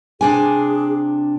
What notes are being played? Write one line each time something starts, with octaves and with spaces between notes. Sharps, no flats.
C3 D4 G#4 G#5